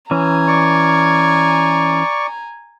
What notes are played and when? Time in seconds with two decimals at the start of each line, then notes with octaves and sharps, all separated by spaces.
0.11 E3 C#4 G#5 A#5
0.48 D5 C#6